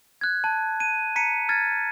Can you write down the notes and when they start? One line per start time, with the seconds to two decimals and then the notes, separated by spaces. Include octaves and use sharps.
0.21 F#6 G#6
0.44 A5
0.80 D#7
1.16 A#5 B6 C#7 D#7
1.49 F6 G#6 A6